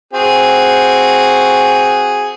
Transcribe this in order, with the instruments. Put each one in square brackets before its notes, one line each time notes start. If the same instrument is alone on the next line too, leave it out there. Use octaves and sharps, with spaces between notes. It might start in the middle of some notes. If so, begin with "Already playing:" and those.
[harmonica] C4 F#4 G#4